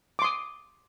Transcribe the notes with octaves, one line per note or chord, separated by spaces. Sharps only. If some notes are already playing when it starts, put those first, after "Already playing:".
C6 D6 D#6